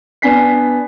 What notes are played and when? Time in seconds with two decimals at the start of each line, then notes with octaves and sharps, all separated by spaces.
0.22 B3 D4 G#5 B6 C7